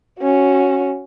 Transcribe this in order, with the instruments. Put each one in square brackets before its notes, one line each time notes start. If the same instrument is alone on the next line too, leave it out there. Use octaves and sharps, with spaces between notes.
[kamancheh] C#4 F#4